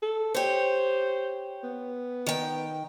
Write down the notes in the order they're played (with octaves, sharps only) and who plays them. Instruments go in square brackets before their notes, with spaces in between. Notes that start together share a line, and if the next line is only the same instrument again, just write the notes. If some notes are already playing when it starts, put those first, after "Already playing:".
[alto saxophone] A4
[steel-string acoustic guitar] G4 C#5 [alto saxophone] C5
[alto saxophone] B3
[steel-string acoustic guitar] D#3 G5